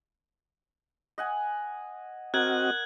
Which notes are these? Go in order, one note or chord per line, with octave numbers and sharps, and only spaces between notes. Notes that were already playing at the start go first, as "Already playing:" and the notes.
D#5 F#5 G#5
C4 F#4 A#4 D#5 F#6 G#6 F#7